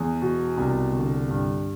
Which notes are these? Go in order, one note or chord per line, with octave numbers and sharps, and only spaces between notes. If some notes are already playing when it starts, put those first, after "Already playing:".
Already playing: E2
B2
C2
D3
G2